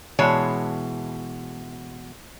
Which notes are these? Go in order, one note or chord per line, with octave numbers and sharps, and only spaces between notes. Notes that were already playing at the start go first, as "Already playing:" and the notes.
B2 E3 G#3 C#5 A5